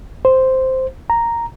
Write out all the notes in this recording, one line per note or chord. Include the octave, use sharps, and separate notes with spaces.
C5
A#5